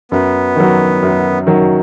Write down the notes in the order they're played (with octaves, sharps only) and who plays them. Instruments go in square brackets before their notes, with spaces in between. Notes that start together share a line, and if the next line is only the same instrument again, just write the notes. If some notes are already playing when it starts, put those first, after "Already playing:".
[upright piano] F#2 [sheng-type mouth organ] B3
[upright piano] D#3 F#3
F#2
D#3 F#3